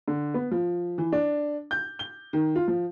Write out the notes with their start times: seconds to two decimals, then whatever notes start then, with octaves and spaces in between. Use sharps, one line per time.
0.08 D3
0.34 B3
0.51 F3
0.98 E3
1.12 D4
1.71 G6
1.99 G7
2.33 D#3
2.56 F4
2.68 F3